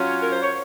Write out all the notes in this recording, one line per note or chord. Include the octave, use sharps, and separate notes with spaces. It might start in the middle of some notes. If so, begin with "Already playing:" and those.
Already playing: F#3 C#4 F4
A#4
C5
C#5